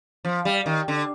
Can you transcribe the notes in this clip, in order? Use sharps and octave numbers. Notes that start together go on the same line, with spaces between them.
F3
G3
D#3
D3